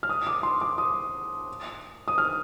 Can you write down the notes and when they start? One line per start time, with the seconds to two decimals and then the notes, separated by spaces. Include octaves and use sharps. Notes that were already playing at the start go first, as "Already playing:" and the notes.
0.03 F6
0.09 D#6
0.27 D6
0.43 C6
0.61 D6
0.78 D#6
2.08 D#6
2.18 F6